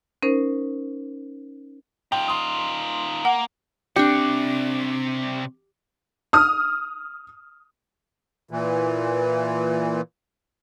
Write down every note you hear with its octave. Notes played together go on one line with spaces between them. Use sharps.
C#4 D#4 A#4 C5
D#4 F4 G5
C6 D#6
A#3 F#5
C3 C4 D4 G4 D5 C#7
D#6 F6
A#2 E3